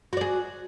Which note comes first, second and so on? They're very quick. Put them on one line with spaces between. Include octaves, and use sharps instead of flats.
F#4 D5 G#4